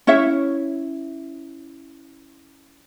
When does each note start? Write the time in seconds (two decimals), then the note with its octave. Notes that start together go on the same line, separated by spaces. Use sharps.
0.07 C#4 E4 C#5 E5